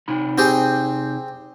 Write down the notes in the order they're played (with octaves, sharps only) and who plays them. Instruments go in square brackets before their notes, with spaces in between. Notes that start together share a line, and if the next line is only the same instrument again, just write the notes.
[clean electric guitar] C3 D#4 B5
[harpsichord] C4 G4 G#4